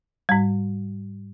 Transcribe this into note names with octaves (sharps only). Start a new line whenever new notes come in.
G#2 G3